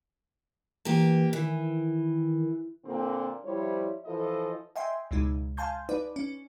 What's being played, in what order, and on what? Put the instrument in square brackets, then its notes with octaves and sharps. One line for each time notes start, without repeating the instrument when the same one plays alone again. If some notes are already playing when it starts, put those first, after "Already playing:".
[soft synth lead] E3 [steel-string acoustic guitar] A#3 G4
[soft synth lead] D#3 [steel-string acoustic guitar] E3
[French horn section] A#2 D3 C4
F3 G3 E4 C5 C#5
E3 F3 A4 D#5
[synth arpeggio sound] D#5 E5 G5 G#5 C6
C#2 B2 G#3 D#4
F5 G#5 A5 C6 G6
D#4 B4 D5
C#4